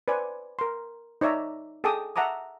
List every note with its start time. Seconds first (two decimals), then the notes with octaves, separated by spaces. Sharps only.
0.08 B4 C5 D5 G#5
0.59 A#4 C6
1.21 D#4 C#5 D5 E5 A#5
1.84 G#4 A4 G5 A5 D6 D#6
2.16 E5 F#5 A5 A#5 D6 D#6